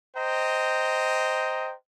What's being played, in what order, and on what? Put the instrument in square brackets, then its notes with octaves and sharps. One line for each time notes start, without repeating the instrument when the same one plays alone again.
[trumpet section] C5 D#5 G5 A#5